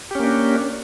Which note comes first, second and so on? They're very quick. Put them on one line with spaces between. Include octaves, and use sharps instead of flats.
G4 C#4 A#3 D4